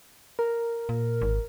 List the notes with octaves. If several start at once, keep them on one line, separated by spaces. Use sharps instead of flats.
A#4
A#2
G#1